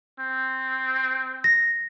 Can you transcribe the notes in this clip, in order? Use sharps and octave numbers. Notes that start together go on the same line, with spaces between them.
C4
A#6